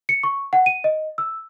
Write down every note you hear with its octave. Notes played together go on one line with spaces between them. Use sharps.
C#7
C#6
F#5
D#7
D#5
E6